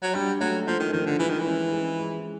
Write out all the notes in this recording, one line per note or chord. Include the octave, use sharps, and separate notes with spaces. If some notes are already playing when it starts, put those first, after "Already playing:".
F#3
G3 D4
F#3 A3
F3 A3
D#3
D#3 F3
D3
E3 G#3
D#3
E3
C#4
G#3
G#3